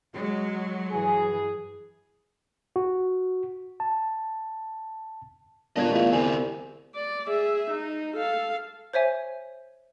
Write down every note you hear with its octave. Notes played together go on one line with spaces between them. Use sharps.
F#3 G#3
G2 E3 G#4
F#4
A5
G1 A#2 F#4 D#5 A5 G#6
E2 A3 B3 F4 D#5 F5
C2 D3 C4 G#5
D5
G#4 E5
D#4
A4 F5
C5 C#5 E5 G#5